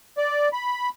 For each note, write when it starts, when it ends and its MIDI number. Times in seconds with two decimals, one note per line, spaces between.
0.18 0.48 74
0.53 0.89 83